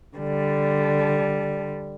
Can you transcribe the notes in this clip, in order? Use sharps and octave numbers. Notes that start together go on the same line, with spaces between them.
D3 G3